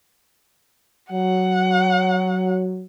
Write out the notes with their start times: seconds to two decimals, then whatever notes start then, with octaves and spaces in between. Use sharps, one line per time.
1.12 F#3 F#5